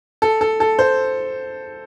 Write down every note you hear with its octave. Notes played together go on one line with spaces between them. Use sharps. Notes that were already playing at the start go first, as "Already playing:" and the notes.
A4
A4
A4
C5